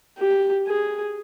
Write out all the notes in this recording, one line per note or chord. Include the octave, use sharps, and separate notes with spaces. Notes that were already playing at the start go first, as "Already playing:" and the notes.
G4
G#4